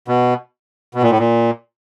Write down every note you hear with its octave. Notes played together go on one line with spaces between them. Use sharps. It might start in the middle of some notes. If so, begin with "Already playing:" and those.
B2
B2
A#2
A2
A#2